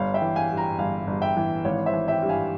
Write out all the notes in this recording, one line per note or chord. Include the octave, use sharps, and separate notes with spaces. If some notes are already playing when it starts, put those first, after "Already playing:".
Already playing: G1 C#5 F5
E5 G5
E3
F5 G#5
G2
G5 A#5
G1 F5 G#5
G1
E5 G5
E3
G#1 C#5 F5
C5 E5
E3
E5 G5
G2
F5 G#5